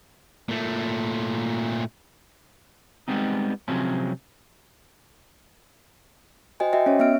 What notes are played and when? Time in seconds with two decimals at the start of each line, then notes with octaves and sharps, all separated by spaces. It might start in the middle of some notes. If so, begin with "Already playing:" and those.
0.49 A#2 A3
3.08 G3 G#3 B3 C4 D#4
3.68 C3 F3 F#3 G#3 C4 C#4
6.60 F#4 C5 D#5 G5 G#5
6.73 F#4 D#5 E5 G5
6.86 C#4 C#5
6.99 B3 E5 F6 D7